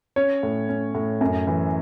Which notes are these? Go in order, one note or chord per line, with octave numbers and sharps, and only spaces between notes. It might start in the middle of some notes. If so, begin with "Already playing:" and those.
C#4 C#5
A2
C#4
A2
F#2
E3